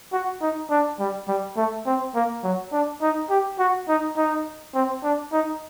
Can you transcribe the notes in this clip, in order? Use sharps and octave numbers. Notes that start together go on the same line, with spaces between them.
F#4
D#4
D4
G3
G3
A3
C4
A#3
F#3
D4
D#4
G4
F#4
D#4
D#4
C4
D4
D#4